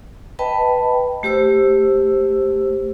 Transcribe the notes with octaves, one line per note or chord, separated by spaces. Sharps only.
B4 D#5 G5 A5 B5
A3 G4 C5 E6